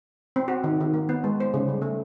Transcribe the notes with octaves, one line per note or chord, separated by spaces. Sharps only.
C4
F#4
D#3
D#3
A#3
B3
G#3
C5
C#3
G3
A3